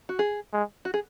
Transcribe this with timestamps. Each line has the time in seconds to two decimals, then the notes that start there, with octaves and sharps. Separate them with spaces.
0.09 F#4
0.19 G#4
0.53 G#3
0.85 F#4
0.94 G#4